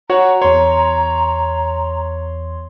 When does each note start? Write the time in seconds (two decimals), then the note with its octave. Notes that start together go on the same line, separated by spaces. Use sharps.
0.10 F#4 C#5 F#5 A#5
0.42 E2 C#5 C6